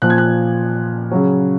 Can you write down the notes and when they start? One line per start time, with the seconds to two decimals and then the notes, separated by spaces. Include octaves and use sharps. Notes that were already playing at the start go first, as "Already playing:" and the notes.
0.02 A#2 F3 F#6
0.10 G#6
0.18 F#6
1.11 C#3 F#3